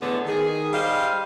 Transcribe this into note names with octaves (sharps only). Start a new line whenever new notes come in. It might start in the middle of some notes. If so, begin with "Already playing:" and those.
E2 A2 D3 A3 B3
D#3 G#4
G3 G4 C5 D#5 F5